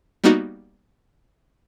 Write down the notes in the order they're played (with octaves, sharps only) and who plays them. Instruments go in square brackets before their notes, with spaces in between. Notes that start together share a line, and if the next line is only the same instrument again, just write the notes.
[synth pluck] G3 A#3 B3 D#4 F#4